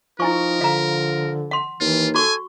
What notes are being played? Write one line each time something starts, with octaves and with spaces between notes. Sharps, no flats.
F3 D#4 E4 A#4 G#5 C#6
D3 F5 A#5
F#5 C6
D#2 E3 F4
F#4 A4 G#5 C#6